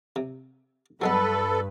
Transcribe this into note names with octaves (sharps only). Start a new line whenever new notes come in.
C3
G2 F#3 G#3 B3 A4 B4